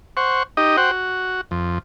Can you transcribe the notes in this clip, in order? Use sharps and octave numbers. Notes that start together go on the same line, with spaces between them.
C5 F#5 C#6
D#4 G4 D#5
F#4 C5 F#5 G5
F#4
F2